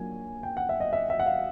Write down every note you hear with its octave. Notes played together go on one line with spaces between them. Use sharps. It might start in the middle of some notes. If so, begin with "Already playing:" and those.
Already playing: F#3 A#3 D4 F4 G#5
G5
F#5
E5
D#5
E5
E5
F#5
F5